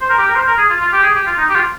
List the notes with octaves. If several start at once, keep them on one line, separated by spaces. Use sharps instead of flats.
C5
A#4
G4
A#4
C5
A#4
G#4
F4
F4
G4
G#4
G4
F4
D#4
G4
F4